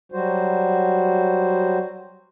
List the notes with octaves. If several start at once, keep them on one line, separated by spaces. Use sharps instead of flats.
F#3 G3 F#4 C5